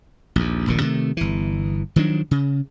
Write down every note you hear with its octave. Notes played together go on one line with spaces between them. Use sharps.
A#1 D#2
D#1 A#1 A#2 D#3
C3 D#3 G#3 A3
G1 E3
D#3 F3 F#3 D4
C#3